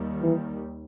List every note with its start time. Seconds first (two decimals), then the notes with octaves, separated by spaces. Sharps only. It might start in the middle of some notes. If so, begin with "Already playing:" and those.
Already playing: D#2 D#3 G3
0.22 E3